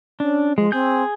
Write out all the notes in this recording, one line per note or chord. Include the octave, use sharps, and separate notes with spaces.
C#4 D4
F3 G#3
C4 G#4 G6